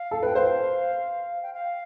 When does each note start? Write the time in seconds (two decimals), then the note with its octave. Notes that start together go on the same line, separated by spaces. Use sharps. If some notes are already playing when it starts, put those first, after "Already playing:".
Already playing: F5
0.11 A4
0.23 B4 G5
0.35 C5 F5
1.42 G5
1.54 F5